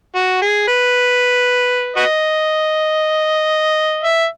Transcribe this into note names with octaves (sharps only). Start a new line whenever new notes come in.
F#4
G#4
B4
F#4 B4 D#5
E5